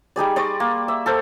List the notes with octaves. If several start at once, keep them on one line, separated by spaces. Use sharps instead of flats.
G3 D#4 G#4 D5
D5 D#5 C6 C#6
A#3
E5
A4 A#4 C5